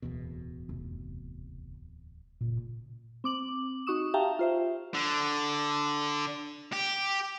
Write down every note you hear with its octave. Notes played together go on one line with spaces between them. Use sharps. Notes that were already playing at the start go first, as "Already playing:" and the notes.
D1 E2 B2
F1
F#1 A#2
C4 D6 F#7
D#4 F#4 C#6 D#6 E7
G4 E5 F5 G5 A5 A#5
F4 C5 E5
D3
G4